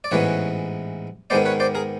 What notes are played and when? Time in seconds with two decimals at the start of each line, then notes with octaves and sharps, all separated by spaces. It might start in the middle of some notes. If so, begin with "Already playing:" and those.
0.04 D5
0.11 A1 G#2 E3 G#3 B3 B4 C#5
1.30 G#2 D#3 G#3 B3 C5 D5
1.45 B4 C#5
1.60 C5 D5
1.75 G#4 A#4